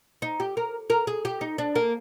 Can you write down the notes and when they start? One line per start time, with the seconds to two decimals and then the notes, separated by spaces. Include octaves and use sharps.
0.22 D#4
0.40 G4
0.57 A#4
0.90 A#4
1.07 G#4
1.25 G4
1.41 D#4
1.58 D4
1.76 A#3